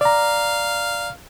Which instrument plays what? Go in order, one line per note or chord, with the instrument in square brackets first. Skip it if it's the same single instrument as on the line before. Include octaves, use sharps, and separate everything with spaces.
[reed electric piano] D5 A#5 [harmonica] F5